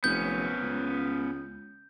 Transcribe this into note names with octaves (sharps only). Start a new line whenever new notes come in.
F1 B3 C#4 G6
C#2